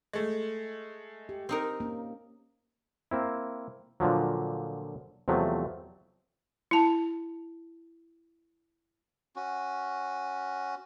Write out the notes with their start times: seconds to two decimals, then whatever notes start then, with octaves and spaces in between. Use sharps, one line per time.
0.13 G#3 A3
1.29 G4
1.49 C4 D#4 A#4
1.80 A#3 C#4
3.11 A#3 C4 E4
4.00 A#2 D3 F3 F#3
5.28 E2 C3 F3 F#3 A3
6.71 E4 A5
9.36 C#4 F#4